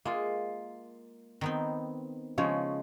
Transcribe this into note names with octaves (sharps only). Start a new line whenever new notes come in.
G#3 A#3 F4
D#3 B3 C4
C#3 F3 G#3 C#5